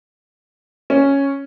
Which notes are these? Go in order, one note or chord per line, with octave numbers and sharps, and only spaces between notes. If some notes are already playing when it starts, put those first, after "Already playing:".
C#4